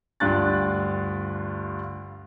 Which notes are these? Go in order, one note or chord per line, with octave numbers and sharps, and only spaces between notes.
D2 G2 D4 F4 F#6 A6